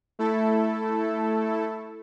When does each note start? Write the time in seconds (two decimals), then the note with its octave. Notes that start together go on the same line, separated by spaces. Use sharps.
0.19 A3 E4 A4